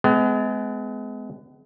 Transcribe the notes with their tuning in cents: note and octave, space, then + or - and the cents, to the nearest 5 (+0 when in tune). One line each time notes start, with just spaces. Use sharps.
G#3 +30 B3 +45